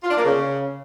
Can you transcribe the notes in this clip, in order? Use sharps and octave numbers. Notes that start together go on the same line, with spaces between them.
F4
D4
A#3
C#3